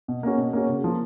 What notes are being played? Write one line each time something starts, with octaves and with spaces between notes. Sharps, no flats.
B2
A#3 C#4 F#4
B2
A#3 C#4 F#4
C#3
F3 A#3 F4